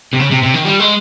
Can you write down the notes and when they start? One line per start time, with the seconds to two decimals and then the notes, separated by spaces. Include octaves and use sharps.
0.13 C3
0.20 C#3
0.31 C3
0.43 C3
0.54 D#3
0.65 G3
0.80 G#3